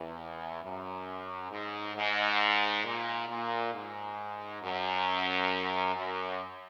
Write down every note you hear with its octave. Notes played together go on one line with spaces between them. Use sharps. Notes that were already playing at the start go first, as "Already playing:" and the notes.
Already playing: E2
F#2
G#2
G#2
A#2
A#2
G#2
F#2
F#2